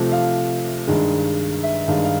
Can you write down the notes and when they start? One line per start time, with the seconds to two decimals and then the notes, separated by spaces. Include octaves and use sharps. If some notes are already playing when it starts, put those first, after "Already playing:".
Already playing: C3 F3 A3
0.12 F5
0.87 G2 D#3 G#3
1.63 E5
1.88 G2 D#3 G#3 F5
2.04 F5